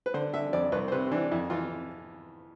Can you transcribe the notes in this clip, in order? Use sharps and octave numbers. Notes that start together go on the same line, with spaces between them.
B4
D3 C5
D3 E5
F2 D5
C2 B4
C5
C3 B4
C4
E3 D4
F2 E4
E3 F4